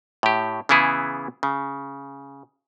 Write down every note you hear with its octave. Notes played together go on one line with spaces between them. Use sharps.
A2 G4
C#3 E3 B3 E4 G#4
C#3